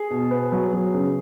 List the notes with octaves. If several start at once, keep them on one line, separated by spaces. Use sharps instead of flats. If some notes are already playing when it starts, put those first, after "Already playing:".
Already playing: G#4
B2
B3
F#3
F#3
C#3